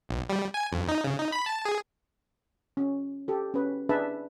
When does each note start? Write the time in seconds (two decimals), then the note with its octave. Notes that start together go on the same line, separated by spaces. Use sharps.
0.09 B1
0.30 G3
0.54 G#5
0.72 F2
0.89 D#4
1.04 C#3
1.19 D#4
1.32 B5
1.46 A5
1.65 G#4
2.77 C#4
3.28 G4 A4
3.54 C#4 B4
3.89 D4 G#4 B4 E5 A5